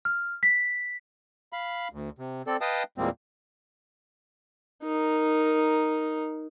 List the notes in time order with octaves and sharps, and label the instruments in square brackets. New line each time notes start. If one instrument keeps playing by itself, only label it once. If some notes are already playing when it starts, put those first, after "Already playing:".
[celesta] F6
B6
[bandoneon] F5 B5
D2
C3
C4 A4 D5
B4 D#5 F5 G5 A5 D#6
E2 A#2 G3 G#3 A#3 C4
[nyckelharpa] D#4 A#4